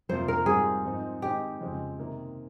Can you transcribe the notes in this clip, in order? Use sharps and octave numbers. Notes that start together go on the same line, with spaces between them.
F2 C3 F3 A#3 F4 C5
A#4
G#2 G3 C4 F4 G#4
G#2 F3 C4 D#4
D#3 G#3 C4 D#4 G4
F2 C#3 F3 G#3 C4
C3 D#3 A#3